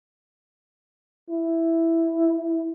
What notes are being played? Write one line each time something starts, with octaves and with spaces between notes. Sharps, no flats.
E4